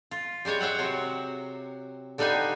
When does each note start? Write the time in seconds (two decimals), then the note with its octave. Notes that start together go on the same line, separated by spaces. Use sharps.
0.11 F4
0.45 G3 G#3 C5 C#5
0.61 C5 C#5 E5 F#5
0.79 C3 F#3
2.18 D3 G3 D#4 B4 F5 G#5